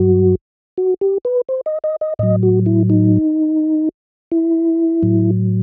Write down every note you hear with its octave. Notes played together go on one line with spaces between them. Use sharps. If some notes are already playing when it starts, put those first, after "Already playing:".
Already playing: G2 F#3 F#4
F#4
G4
B4
C5
D#5
D#5
D#5
A2 F#3 D#5
F#4
E4
D#4
E4
A2 F#3